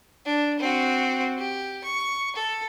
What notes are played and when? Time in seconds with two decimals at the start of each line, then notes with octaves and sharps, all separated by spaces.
0.25 D4
0.59 C4 F#4
1.38 G4
1.84 C#6
2.36 A4